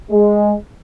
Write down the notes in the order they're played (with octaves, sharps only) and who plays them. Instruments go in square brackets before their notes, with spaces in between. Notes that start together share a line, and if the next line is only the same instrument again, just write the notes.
[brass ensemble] G#3